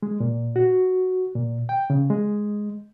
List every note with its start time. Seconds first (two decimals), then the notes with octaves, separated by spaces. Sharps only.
0.03 G#3
0.20 A#2
0.56 F#4
1.35 A#2
1.69 G5
1.90 C#3
2.10 G#3